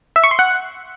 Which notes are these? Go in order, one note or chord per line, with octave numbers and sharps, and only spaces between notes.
E5
C#6
C6
F#5